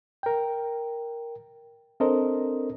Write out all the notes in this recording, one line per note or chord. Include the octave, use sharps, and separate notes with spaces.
A#4 G5
C4 D4 A4 A#4 C5 D#5